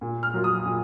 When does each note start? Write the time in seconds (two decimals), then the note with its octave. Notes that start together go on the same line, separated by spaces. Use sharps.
0.01 A#2
0.23 F6
0.34 F#3 A#3 F4
0.44 D#6
0.65 A#2